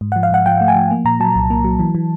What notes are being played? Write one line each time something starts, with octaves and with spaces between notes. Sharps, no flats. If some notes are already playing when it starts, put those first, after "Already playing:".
G#2
F3 F#5
F5
G#2 F#5
F3 G5
A3
G#5
F3
A#3
A#2 A#5
F#3 A5
C2
A#3
F#3
E3
E3